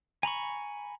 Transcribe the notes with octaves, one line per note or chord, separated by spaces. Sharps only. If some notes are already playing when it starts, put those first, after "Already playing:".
G#5 A#5 B5 C#6